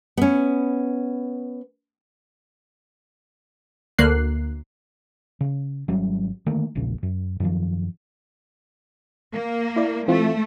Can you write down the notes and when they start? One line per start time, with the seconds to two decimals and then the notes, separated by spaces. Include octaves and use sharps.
0.17 B3 C#4
3.99 D2 A#3 F#6 C7
5.41 C#3
5.88 G#1 F#3 G3 C#4
6.46 D3 D#3 A3 A#3
6.75 E1 A#1 A#2 C#3
7.03 F#2
7.40 F#2 D#3 F3
9.32 A#3
9.76 E4 D5
10.08 E3 A3 C4 F4